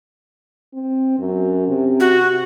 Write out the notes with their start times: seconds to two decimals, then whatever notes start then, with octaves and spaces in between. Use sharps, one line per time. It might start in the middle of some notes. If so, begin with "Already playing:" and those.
0.74 C4
1.19 F#2
1.68 C3
2.00 F#4